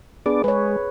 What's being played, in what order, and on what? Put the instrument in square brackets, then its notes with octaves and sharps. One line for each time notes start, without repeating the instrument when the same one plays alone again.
[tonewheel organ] B3 D4 D5 [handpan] G#4
[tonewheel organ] G#3 [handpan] B4 C#5